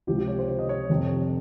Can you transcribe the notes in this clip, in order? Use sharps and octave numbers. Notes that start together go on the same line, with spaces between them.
C#2 C3 F3 G4
G4
C#5
C5
C5
D#5
C#5
F1 F2 C3